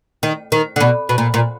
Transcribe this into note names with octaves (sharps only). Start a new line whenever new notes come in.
D#3
D#3
D3
B2
B2
A#2
A#2